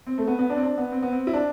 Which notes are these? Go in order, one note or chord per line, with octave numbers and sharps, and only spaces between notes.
C4
A3
B3
B3
D4
C4
D4
B3
C4
B3
C4
E4
D4